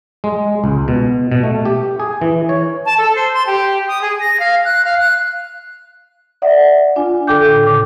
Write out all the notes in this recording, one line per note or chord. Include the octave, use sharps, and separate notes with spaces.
G#3
C#2
B2
B2
A3
G4
G#4
E3
C#5
A5
A4
C5
C6
G4
D#6
G#4
A#6
F5
F#6
F5
F#6
D5 E5 F#5
D4 F4 G#5
D3 A4 G5 D6 G6
A2
C#3 D6